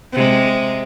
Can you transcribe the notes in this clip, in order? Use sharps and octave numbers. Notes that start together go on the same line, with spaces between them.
C3 G#3